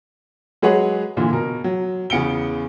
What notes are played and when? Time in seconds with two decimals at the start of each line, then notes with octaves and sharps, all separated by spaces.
0.62 F#3 G#3 G#4 B4 C#5 F#5
1.17 A#2 D3 E3
1.33 B2 A#4
1.64 F#3
2.10 E2 C#3 B3 C#7 D7 G7